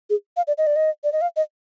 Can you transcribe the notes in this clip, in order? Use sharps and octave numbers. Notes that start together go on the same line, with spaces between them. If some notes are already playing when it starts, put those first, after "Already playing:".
G#4
F5
D5
D#5
D5
D#5
D5
D#5
F5
D#5